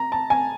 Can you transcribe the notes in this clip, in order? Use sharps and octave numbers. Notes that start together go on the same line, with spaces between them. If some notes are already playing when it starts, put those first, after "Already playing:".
Already playing: A#5
A5
G#5